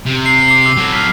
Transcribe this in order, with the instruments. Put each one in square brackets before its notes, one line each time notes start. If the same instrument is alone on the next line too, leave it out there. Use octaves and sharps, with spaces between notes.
[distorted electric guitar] C3
[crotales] C7
D6 C7
D6 E6
[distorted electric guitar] F#3 A4
[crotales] F6 B6